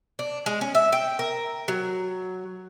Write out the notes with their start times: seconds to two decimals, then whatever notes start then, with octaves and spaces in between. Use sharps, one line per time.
0.19 D4
0.46 G#3
0.61 C#4
0.75 E5
0.92 G5
1.19 A#4
1.68 F#3